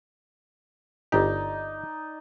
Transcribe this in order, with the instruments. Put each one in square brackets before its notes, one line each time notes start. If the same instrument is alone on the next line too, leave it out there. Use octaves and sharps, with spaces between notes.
[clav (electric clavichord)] G1 G4 [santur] D#4 D5